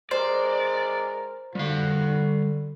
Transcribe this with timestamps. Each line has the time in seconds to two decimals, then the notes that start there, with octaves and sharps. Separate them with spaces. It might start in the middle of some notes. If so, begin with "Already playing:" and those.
0.11 G#3 A#4 C5 D5
1.55 D3 G3 F#4 F5